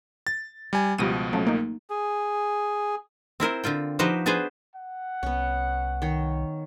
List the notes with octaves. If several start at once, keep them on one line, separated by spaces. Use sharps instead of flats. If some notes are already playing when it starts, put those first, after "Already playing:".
A6
G3 G#5
C#2 B2 F3 G3 A#6 D#7
C#3 F#3 A3
A#3 D#4
G#4
C4 E4 A#4 C5
D3 C4 F4 G5
F3 D#4 F#4 G4 B4 C5
B3 D4 G#4 B4 C5
F#5
C2 B3 C#4
D#3 C#5